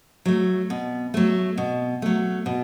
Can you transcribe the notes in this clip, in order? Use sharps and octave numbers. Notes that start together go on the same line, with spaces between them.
F#3 A3
B2
F#3 A3
B2
F#3 A3
B2